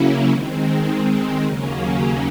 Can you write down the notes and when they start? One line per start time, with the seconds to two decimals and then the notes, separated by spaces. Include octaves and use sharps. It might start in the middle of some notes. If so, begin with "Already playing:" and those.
Already playing: C#3 F#3 A#3 C#4 E4
0.29 D#3 G#3 C4
1.43 D#2 C#3 F#3 A#3 C#4